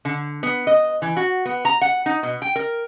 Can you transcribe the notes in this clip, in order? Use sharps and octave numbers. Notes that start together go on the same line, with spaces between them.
D3
B3
D#5
E3
F#4
B3
A#5
F#5
D#4
B2
G5
A#4